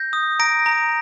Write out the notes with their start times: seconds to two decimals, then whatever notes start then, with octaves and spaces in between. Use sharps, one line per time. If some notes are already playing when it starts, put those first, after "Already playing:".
Already playing: G6 A#6
0.13 D#6
0.39 A#5 A#6 D7
0.66 A#5